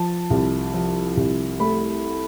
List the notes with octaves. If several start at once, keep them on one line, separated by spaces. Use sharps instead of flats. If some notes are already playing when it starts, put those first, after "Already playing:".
Already playing: F3 A5
C2
F3
C2
A3 B5